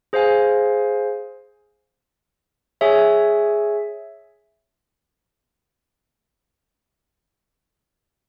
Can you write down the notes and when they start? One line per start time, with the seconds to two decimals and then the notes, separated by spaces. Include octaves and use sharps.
0.13 G#4 C5 F5 G#5
2.81 G#4 C#5 E5 G#5